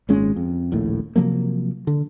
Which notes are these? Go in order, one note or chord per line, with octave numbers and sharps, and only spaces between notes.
G#1 A#2 G#3 C#4
F2
D#1 A#1 A2
C3 F3 F#3 A#3
D3